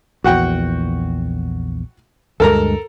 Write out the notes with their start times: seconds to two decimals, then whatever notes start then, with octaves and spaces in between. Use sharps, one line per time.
0.24 A#1 E2 F#4 F#5 G5
2.40 D2 G2 G#3 A4 A#4 A#5